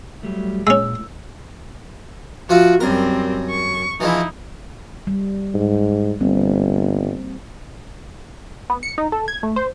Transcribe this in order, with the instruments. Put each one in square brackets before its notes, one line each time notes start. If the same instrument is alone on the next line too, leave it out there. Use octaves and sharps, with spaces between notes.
[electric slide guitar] F#3 G3 A3
[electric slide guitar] A#2 [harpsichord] G#3 C#4 [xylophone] E6
[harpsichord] F3 F4 E5 [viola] F#4
[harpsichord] F#2 A#4 [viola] G3 C4
[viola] C#6
[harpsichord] E3 F3 G#3 [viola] D#4 E4
[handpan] G3
[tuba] G#2
[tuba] G1 [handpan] G3 A#3 C4
[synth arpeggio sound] B3
C#7
D#4
A4
G#6
A3
C5